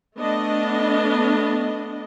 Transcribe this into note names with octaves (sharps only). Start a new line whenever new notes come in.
A3 B3 D4 D#5